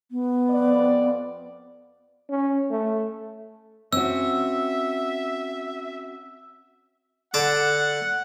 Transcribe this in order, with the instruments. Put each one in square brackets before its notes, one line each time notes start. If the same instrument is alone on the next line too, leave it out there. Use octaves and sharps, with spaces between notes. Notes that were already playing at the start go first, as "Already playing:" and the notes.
[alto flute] B3
[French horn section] F2 D5
[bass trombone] C#4
A3
[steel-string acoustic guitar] C4 C#4 F#4 [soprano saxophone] E5 [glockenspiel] E6
[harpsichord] D3 A5 D6 [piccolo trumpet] F#5